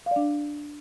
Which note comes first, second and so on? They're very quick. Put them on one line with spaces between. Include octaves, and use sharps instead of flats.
F5 D5 D4